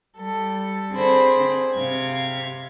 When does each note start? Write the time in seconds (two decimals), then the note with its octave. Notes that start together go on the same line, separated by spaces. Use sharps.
0.17 G3 A4
0.92 D3 C4 G#4 C5 B5
1.77 C3 F5 G#6